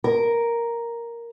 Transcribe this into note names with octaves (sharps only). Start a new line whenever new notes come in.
A#4